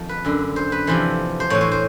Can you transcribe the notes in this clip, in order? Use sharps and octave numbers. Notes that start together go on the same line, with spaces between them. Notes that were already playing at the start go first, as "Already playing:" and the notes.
Already playing: F2 D#3
B4
F#2 D3
C5
B4
F2 C3 E3 C5
C5
A2 E3 C#5
C5
C5